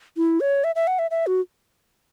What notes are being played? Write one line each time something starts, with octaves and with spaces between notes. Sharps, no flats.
E4
C#5
E5
E5
F#5
E5
E5
F#4